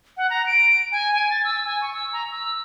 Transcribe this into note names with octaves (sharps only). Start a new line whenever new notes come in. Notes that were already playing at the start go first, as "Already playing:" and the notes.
F#5
A#5
D7
G#5
G#5
A6
E6
G#5
C#6
E6
A#5
E6